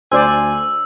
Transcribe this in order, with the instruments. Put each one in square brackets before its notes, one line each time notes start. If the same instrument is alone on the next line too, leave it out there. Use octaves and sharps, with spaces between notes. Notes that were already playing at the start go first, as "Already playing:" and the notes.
[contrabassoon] D2 [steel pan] C5 D5 [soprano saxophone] G#5 [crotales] E6